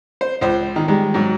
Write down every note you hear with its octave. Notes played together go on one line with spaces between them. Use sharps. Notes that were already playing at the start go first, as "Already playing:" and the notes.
C5
C#2 C5
D#3
D#3 G3 G#3
G#2 F#3